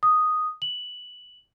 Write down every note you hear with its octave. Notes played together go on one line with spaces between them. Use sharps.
D#6
F#7